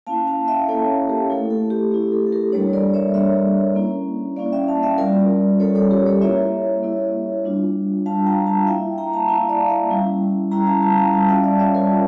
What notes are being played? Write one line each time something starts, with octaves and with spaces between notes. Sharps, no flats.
A#3 C#4 E4 F5 A5
F5 A5
E5 G5
A#3 C#4 E4 A4 C#5
G4 A#4
A3 E4 A4
A4
G4
A3 E4 G4
A4
A4
G4 A#4
G3 A#3 D4 A4 C#5
A#4 D5
C#5 E5
G3 A#3 D4 C#5 E5
A#3 C#4 E4
A#3 C#4 E4 D5 F5
E5 G5
F5 A5
E5 G5
G3 C#4 F4 A#4 D5
G3 C#4 F4 A4 C#5
A4 C#5
G4 A#4
A4 C#5
A#3 E4 C#5 E5
A#3 E4
G3 D4 F4
G3 D4 F4 F5 A5
G5 A#5
F5 A5
A#3 E4 E5 G5
G5 A#5
F5 A5
A#3 E4 F5 A5
D5 F5
E5 G5
G3 C#4 E4
G3 C#4 E4 G5 A#5
F5 A5
F5 A5
G5 A#5
G5
G3 C#4 F4 F5 A5
E5 G5
D5 F5
C#5 E5
G3 C#4 F4 A#4 D5